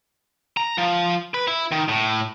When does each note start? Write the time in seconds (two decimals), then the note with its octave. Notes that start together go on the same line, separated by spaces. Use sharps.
0.57 A#5
0.78 F3
1.34 B4
1.48 E4
1.72 D#3
1.89 A2